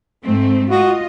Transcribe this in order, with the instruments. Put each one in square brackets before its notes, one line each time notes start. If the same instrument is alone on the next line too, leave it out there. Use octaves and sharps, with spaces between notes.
[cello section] G#2 A3 C4
[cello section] F4 D#5 [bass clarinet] F#4